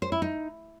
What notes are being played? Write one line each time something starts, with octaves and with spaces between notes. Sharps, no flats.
C5
E4
D#4